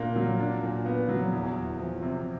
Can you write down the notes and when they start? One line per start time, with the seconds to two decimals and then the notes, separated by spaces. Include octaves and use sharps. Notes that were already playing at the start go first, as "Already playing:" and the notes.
Already playing: A#2 A#3 D4
0.16 F#3
0.40 D4
0.63 A#2
0.86 B3
1.09 F#3
1.32 E2
1.56 E2
1.79 F3
2.02 C3